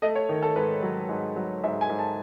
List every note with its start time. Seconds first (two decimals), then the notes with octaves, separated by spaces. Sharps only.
0.02 A3 D#5
0.15 C#5
0.29 D#3
0.42 A4
0.56 G#2 B4
0.83 F#3
1.09 G#2
1.36 F#3
1.64 G#2 E5
1.81 G#5
1.89 G#2
1.99 A5